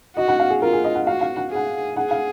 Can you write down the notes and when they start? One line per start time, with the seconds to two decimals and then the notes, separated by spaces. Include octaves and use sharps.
0.16 F#4 D#5
0.28 F#5
0.40 F5
0.50 G#4
0.61 F4 A#4
0.73 G#4
0.84 D#5
0.95 F#5
1.06 F#4 F5
1.21 F5
1.36 F#5
1.51 G#4 F#5
1.96 G#4 F#5
2.11 F5